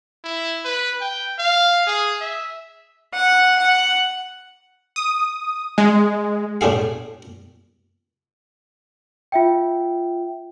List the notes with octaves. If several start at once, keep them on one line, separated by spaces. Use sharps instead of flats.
E4
B4
G5
F5
G#4
E5
F#5
F#5
D#6
G#3
A2 D4 G4 G#4 F5
F4 E5 G5